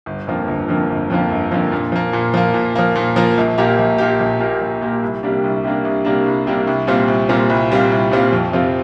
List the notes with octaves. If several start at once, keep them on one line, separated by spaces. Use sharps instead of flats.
G1
F2 D3 F3 A#3
G1
F2 D3 F3 A#3
G1
F2 D3 F3 A#3
G1
F2 D3 F3 A#3
A#2
F3 A#3
A#2
F3 A#3
A#2
F3 A#3
A#2
F3 A#3
A#1
A#2 A#3 G4
A#1
A#2 A#3 G4
A#1
A#2 A#3 G4
A#1
A#2 A#3 G4
C2
C3 G3 A#3 D4
C2
C3 G3 A#3 D4
C2
C3 G3 A#3 D4
C2
C3 G3 A#3 D4
C2
A#2 G3 C4 F4
C2
A#2 G3 C4 F4
C2
A#2 G3 C4 F4
C2
A#2 G3 C4 F4
F2
C3 F3 C4 F4